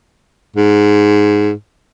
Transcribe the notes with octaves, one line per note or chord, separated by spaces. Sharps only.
G#2